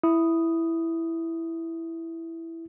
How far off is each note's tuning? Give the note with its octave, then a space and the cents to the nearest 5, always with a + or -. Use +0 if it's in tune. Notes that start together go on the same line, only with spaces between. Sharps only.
E4 +0 D#6 +0